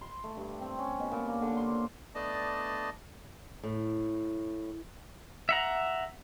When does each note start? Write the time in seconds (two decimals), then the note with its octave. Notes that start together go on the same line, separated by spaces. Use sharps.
0.01 C6
0.24 A3
0.37 G2
0.61 C4
0.79 C#4
0.99 B2
1.11 A#2
1.28 A#3
1.42 D3
1.57 C6
1.70 C5
2.15 A3 B3 D4 D5 D#5 A5
3.63 A2
5.49 E5 F#5 A#5